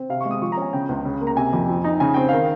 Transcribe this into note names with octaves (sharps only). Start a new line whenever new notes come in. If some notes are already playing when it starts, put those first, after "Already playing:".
Already playing: C4
C3 F5
C#6
G#3
D#6
F3 C#6
A#5
C#4 G#5
C#3 G5
C#2
C#3
A#3
A#5
C3 G#5
F2
F3
D#4
C#3 G#5
C4 G5
D#3 F5